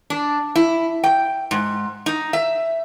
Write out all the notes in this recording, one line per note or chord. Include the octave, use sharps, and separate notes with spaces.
D4
E4
G5
G#2
D#4
E5